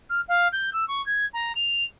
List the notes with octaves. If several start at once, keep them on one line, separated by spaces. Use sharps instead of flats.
F6
F5
G6
E6
C#6
G#6
A#5
F7